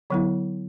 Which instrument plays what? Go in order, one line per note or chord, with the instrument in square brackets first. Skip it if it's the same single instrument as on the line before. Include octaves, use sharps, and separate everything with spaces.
[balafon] D3 F#3 B3 E4